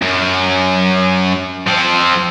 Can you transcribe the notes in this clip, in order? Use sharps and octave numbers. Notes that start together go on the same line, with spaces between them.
F#2
F3 C4